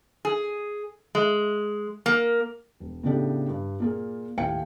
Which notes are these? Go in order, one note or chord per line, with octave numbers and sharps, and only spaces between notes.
G#4
G#3
A#3
E1
A2 C#3 B3 D4 G4 A4
G2
A#2 A#3 G#4
D#2 A2 F5 G5 G#5 C#7